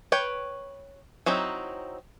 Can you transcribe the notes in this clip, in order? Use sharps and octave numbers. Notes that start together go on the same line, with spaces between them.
B4 C#5 G5
F#3 C4 D#4 E4